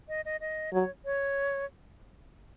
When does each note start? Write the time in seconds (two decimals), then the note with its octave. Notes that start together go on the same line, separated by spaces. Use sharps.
0.08 D#5
0.25 D#5
0.41 D#5
0.73 F#3 C#5
1.05 C#5